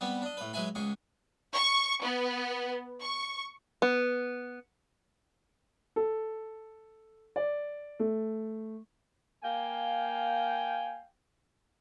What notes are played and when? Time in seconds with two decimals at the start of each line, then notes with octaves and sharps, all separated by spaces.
0.01 G3 B3 C4
0.22 D4 D#5
0.37 A2 B4
0.53 F#3 G#3 B4 E5 G#5 B5
0.75 C#2 G#2 G#4 C#6
1.53 C#6
2.02 B3
3.01 C#6
3.82 B3
5.96 A4
7.36 D5
7.99 A3
9.43 A#3 F5 G5 G#5